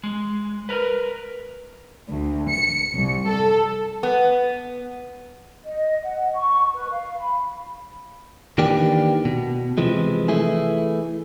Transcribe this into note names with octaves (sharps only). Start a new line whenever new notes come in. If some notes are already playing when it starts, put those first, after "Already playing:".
G#3
A#4 B4
D2
C#7
C2
A4
B3
D#5
F#5
C#6
B4
F5
B5
D#3 E3 A#3 D4 G4
B2
C3 E3 F3 G#3
E3 A3 E4 G#4